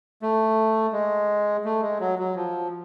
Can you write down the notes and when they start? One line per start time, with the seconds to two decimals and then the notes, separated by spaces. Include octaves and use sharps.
0.22 A3
0.93 G#3
1.65 A3
1.82 G#3
2.00 F#3
2.19 F#3
2.36 F3